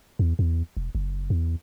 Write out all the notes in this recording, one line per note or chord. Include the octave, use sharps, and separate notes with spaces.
E2
E2
E1
F#1
E2